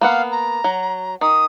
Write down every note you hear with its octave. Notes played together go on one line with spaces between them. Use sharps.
A#3 B3 F5 F#5
A#5
F#3
D#3 D#6